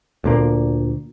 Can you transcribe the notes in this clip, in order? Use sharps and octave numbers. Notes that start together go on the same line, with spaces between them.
D2 A#2 A#3